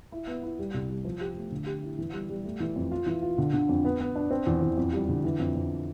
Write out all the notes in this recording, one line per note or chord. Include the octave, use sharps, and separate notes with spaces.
E4
B3
E4
G3
C2
G3
F3
G4
A3
D3
G4
E4
E3
G3
G3
A3
E3
F2
F4
E3
F4
D3
D3
F2
B3
B3
D4
C4
E2
E2
F2
G3
D3
E3
F2
F2